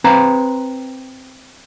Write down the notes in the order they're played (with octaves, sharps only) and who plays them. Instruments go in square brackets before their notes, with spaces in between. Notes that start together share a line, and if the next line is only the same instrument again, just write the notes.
[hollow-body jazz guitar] C4 B4 A#5